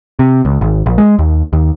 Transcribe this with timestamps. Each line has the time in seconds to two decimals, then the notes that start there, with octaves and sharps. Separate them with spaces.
0.19 C3
0.45 C#2
0.61 G#1
0.86 A#1
0.98 G#3
1.19 D#2
1.53 D#2